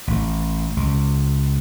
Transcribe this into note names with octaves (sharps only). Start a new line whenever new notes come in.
A1
C#2